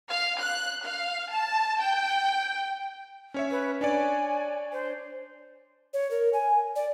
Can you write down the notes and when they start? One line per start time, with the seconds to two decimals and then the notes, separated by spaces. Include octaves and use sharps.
0.12 F5
0.42 F#6
0.87 F5
1.32 A5
1.82 G5
3.34 C#4 C#5 E5
3.51 B4
3.81 D4 C#5 D5 G#5
4.72 C5
5.94 C#5
6.11 A#4
6.33 G#5
6.76 D5